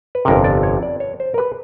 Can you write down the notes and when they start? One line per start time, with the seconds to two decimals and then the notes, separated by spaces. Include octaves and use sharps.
0.15 B4
0.25 G1 F2 C3 A#4
0.44 D5
0.63 C#5
0.83 D5
1.00 C#5
1.20 C5
1.34 A#4
1.38 B4